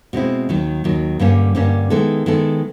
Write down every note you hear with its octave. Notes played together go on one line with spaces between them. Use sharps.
B2 G#3 C4 E4
D#2 D#3 F#3
D#2 D#3 F#3
G2 D3 G3 A#3 C#4
G2 D3 G3 A#3 C#4
D#3 G#3 B3 E4 A4
D#3 G#3 B3 E4 A4